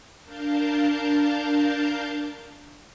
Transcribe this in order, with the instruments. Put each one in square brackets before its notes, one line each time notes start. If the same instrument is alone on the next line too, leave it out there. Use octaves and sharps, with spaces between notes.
[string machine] D4 A#4 F5 A5 G6